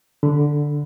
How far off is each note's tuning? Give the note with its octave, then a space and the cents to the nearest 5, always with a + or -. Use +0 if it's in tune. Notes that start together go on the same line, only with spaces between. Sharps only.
D3 +0 B5 +0